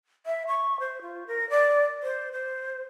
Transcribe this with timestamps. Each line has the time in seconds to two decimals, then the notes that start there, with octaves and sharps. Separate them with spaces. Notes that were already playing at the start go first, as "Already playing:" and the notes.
0.26 E5
0.48 C#6
0.80 C5
1.02 F4
1.27 A#4
1.50 D5
2.03 C5
2.32 C5